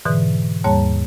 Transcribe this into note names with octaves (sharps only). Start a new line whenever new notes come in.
G#2 B2 D3 E3
D#2 G#2 G3 A#3 C#5 A5